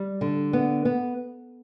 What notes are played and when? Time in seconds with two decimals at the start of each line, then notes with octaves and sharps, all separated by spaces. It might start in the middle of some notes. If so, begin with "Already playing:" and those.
Already playing: G3
0.21 D3
0.53 B3
0.85 B3